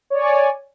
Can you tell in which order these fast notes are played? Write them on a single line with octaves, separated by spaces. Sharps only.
C#5 D5 G#5